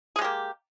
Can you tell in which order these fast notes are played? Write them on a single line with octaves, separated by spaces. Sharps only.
G#4 G#3 G4 A#3